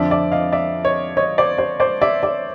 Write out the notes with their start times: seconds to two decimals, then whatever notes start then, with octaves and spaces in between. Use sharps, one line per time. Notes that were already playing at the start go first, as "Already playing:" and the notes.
Already playing: F2 D3 F3 D5 E5
0.10 D5 E5
0.32 D#5 F5
0.52 D5 E5
0.85 C#5 D#5
1.17 C#5 D#5
1.38 C5 D5
1.58 C5 D5
1.80 C5 D5
2.01 D5 E5
2.23 D5 E5